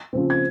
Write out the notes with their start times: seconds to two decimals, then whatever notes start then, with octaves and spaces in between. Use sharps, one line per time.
0.13 C#3 F3 C4
0.30 G#6